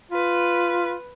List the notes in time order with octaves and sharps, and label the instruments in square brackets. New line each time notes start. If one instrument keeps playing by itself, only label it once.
[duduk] F4 [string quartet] B4